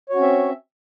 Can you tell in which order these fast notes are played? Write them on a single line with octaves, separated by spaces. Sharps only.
C#5 F#4 C#4 C4 E5